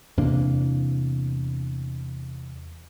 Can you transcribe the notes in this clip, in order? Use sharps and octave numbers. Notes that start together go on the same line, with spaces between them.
E2 C3 A#3 D4